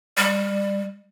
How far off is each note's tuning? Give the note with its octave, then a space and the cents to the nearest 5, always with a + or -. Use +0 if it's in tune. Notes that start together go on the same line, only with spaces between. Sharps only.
G3 +25